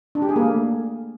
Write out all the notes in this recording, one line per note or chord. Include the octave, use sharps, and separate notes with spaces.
D4
G4
G#4
A#3
A3